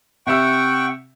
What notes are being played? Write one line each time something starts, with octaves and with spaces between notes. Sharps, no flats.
C3 E5 F#5 G5 C#6 E6